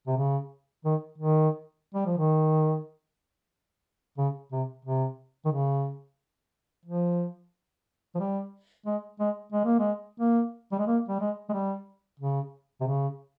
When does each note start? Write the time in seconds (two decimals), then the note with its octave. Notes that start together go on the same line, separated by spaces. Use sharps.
0.07 C3
0.17 C#3
0.85 D#3
1.18 D#3
1.94 G3
2.06 F3
2.18 D#3
4.18 C#3
4.52 C3
4.85 C3
5.45 D#3
5.51 C#3
6.85 F3
8.15 F3
8.20 G3
8.86 G#3
9.20 G#3
9.52 G#3
9.65 A#3
9.79 G#3
10.20 A#3
10.72 G3
10.79 G#3
10.87 A#3
11.08 G3
11.20 G#3
11.49 G#3
11.53 G3
12.19 C#3
12.81 C3
12.87 C#3